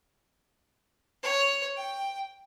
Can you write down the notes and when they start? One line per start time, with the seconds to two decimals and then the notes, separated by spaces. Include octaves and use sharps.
1.23 C#5
1.77 G5